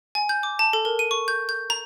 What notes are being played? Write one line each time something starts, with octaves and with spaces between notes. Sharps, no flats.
G#5
G6
D6
A5
A4
A#4
D#7
C#6
G6
G6
A#5